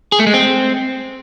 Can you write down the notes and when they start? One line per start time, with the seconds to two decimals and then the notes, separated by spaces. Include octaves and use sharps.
0.12 G#4
0.19 A3
0.27 G#3
0.34 C4